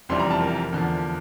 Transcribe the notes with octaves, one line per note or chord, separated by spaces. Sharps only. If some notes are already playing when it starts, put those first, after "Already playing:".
F1 F2 E3 G3 D4 C6
A#5
A5
A#4
E2 D3 F3